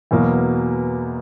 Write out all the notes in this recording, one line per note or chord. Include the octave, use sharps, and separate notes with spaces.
E2 B2 F#3 A#3